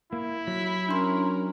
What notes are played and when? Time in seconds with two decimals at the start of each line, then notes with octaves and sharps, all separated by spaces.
0.13 A#3 E4
0.47 F#3 B6
0.89 C#4 D4 A#4 C6